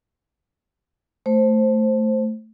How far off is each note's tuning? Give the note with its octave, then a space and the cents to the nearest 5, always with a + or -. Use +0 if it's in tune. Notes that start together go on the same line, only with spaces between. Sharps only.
A3 +0 C5 +5